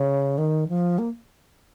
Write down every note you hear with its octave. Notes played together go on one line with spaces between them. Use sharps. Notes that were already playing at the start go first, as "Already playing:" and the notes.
Already playing: C#3
D#3
F3
A#3